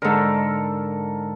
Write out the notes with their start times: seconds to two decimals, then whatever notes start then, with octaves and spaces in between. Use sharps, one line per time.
0.02 G#2 D3 A4 A#4